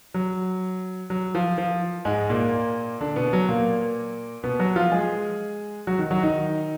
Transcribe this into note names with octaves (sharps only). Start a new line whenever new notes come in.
F#3
F#3
F3
F3
G#2 G#3
A#2 A#3
D3 D4
B2 B3
F#3
A#2 A#3
B2 B3
F#3 F#4
F3 F4
G#3 G#4
F#3 F#4
D#3 D#4
F#3 F#4
D#3 D#4